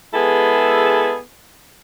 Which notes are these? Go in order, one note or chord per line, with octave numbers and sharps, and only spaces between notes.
G#3 B3 E4 G#4 A4